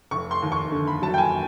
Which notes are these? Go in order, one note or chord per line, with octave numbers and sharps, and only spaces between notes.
F1 C#6
C6
D#2
C#6
D3
B5
F#3 A5
G5
G#5